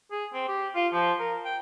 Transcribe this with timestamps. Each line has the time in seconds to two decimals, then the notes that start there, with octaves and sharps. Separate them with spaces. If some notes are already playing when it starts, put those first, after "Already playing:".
0.12 G#4
0.34 C4
0.48 G4
0.75 F4
0.93 F3
1.19 A#4
1.45 G5